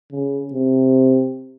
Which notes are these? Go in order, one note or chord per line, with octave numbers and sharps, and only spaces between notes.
C#3
C3